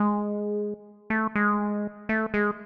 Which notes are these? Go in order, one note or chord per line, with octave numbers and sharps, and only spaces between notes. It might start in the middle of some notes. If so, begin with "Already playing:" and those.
Already playing: G#3
A3
G#3
A3
G#3